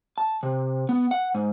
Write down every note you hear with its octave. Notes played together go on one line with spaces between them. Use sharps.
A5
C3
B3
F#5
G#2